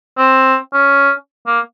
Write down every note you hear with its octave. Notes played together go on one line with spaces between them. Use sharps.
C4
C#4
A#3